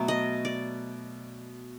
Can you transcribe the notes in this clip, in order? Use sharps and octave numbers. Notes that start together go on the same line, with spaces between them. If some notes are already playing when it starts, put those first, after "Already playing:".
Already playing: B2 F#3 A3
D#5
D5